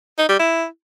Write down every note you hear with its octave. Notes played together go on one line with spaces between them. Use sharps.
D#4
G3
E4